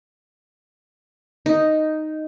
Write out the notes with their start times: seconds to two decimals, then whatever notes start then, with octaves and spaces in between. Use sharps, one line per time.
1.46 D#4